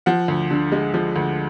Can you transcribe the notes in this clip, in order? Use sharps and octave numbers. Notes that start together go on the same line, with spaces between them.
F3 F#5
D2
D3
G#3
F3
D2